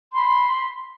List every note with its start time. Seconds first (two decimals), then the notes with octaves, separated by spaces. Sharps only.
0.14 B5 C6